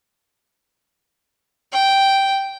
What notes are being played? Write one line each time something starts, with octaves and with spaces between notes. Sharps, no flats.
G5